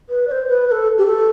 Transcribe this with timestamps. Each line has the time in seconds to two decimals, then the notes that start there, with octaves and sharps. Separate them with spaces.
0.09 B4
0.28 D5
0.31 C5
0.48 B4
0.68 B4
0.72 A4
0.98 G4
1.06 A4